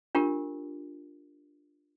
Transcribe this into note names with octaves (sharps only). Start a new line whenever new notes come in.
D4 F4 G4 A#4